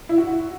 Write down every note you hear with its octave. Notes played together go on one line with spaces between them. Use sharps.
E4
F#4